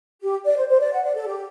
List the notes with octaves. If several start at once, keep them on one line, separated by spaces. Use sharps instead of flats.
G4
D5
C5
C5
D5
F#5
D5
A4
G4